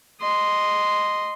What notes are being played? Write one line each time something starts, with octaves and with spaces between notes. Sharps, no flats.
D#5 C6